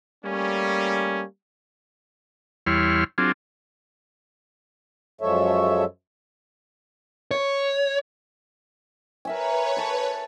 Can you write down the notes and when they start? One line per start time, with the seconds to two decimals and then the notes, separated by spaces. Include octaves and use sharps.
0.24 G3 A3 A#3 C#4
2.67 E2 G3 E4 C#5 C6 F6
3.18 F#3 C4 D4 F4 G#4
5.21 F#2 F3 G#3 A4 C#5 E5
7.31 C#5
9.25 A#4 B4 C#5 E5 G#5
9.76 A4 A5